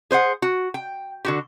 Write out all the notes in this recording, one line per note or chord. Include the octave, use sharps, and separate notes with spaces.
G#4 C5 C#5 F#5
F#4
G5
D3 F#4 G4